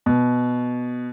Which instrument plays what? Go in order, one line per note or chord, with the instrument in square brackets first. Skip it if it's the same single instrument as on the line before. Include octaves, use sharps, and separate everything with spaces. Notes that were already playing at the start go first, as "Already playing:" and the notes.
[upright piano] B2